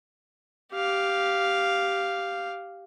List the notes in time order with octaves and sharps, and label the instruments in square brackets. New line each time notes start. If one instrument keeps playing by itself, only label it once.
[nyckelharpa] G4 F5